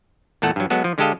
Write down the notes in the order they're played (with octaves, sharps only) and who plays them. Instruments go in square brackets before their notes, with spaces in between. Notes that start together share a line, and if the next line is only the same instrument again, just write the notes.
[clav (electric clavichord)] E2 A#2 A3 A4 F#5
G2 F#3
F#3 G#3 B3 A4
F3
D3 G#3 G4 A4 D#5 F5